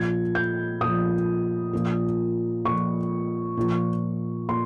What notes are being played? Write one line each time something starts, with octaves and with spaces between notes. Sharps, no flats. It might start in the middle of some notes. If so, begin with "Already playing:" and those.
Already playing: A#2 F3 G#6
G6
A#2 F3 D#6
A#2 F3
A#2 F3 C#6
A#2 F3
A#2 C6